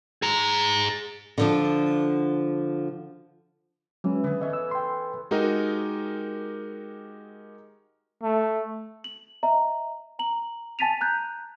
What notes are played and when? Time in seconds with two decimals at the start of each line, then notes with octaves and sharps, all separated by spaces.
0.22 G#4 A#5
1.38 D3 F3 D4
4.04 E3 F#3 G#3 C#4
4.24 D3 B3 G#4
4.41 C#4 A4 D#5 E5
4.53 E6
4.71 G5 C6
5.31 G#3 D#4 F#4 G4 A#4 D#5
8.23 A3
9.04 F#7
9.43 D#5 E5 A#5
10.19 A#5 F#7
10.79 G#5 A5 A6 B6 D#7 F7
11.01 A#5 F#6 G6